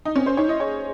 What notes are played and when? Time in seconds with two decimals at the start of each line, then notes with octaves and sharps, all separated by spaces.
0.05 D#4
0.16 C4 C#4
0.26 C#4 C5
0.37 D#4 C#5
0.48 E4 D#5
0.60 G#4 C#5